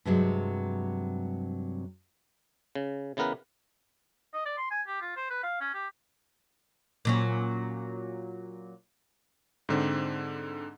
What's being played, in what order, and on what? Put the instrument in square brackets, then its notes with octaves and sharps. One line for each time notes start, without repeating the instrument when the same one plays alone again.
[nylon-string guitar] G2 C3 F#3 G#3
[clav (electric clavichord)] C#3
C#3 E3 B3 A#4 B4
[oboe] D#5
D5
C6
G#5
G4
F4
C5
B4
F5
C#4
G4
[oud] A#2 F#3 C#4
[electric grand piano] G#2 D3 C4